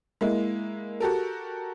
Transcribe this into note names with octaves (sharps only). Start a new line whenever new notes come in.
G#3 A#3 E4
F#4 G4 A4 A#4